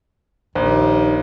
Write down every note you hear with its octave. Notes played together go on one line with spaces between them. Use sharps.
A#1 D#2